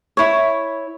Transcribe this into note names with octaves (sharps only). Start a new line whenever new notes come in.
E4 C#5